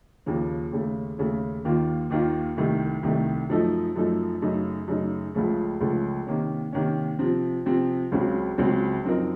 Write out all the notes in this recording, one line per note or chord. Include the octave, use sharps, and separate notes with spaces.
D#2 C#3 F3 A#3
D#2 C#3 A3
D#2 C#3 A3
D#2 D#3 A#3 F4
D#2 D#3 A#3 F4
C2 C3 D#3 A3
C2 C3 D#3 A3
F#2 F3 A3 D#4 A4
F#2 F3 A3 D#4 A4
F#2 C#3 A3 D#4
F#2 C#3 A3 D#4
C#2 C#3 F3 A3
C#2 C#3 F3 A3
C3 D#3 A#3 C#4
C3 D#3 A#3 C#4
C3 F3 C4
C3 F3 C4
C#2 C#3 F#3 C4
C#2 C#3 F#3 C4
F#2 F3 C4 D#4 A#4